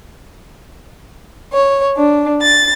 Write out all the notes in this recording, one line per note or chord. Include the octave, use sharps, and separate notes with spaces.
C#5
D4
A6